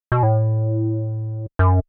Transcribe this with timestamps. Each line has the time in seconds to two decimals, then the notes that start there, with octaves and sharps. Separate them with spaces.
0.12 B2
0.23 A2
1.59 F#2